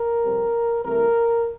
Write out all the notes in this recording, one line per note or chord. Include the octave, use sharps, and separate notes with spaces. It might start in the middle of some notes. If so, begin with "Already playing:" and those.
Already playing: A#4
F2 C3 G3 C4
C2 C3 E3 A3 A#4